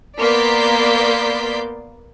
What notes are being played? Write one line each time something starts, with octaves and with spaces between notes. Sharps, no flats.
A#3 B3 D5 C6 G6 B6